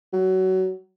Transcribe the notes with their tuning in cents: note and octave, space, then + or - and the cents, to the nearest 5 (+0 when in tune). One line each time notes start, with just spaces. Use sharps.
F#3 +20